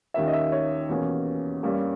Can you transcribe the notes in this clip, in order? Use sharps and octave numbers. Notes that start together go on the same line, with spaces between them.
D#2 D#3 A#3 C#4 E5
D#5
E5
C#5
E2 B2 A#3 C#4
G2 G3 A#3 C#4